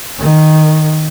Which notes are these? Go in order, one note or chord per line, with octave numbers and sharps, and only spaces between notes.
D#3